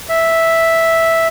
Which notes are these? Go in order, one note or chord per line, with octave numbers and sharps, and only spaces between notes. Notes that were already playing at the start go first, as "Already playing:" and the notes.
E5